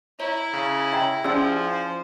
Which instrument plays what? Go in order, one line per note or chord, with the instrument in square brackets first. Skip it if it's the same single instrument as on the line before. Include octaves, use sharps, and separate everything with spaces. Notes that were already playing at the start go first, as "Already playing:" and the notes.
[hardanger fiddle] E4 [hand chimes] C#5 A#5
[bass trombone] C#3
[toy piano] D#5 G5 A#5 [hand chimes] E5
[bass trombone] F3 [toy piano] C#4 D5 E6 [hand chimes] G#4 C6
[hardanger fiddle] C5